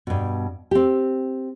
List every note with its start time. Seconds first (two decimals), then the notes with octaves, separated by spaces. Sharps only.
0.07 G2 B2
0.71 C4 G4